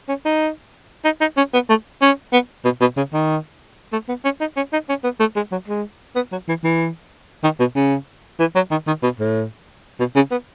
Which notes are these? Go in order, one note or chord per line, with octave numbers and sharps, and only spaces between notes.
C#4
D#4
D#4
D#4
C#4
B3
A3
C#4
B3
B2
B2
C#3
D#3
A3
B3
C#4
D#4
C#4
D#4
C#4
B3
A3
G#3
F#3
G#3
B3
F#3
E3
E3
D#3
B2
C#3
E3
F#3
D#3
D#3
B2
A2
B2
C#3
B3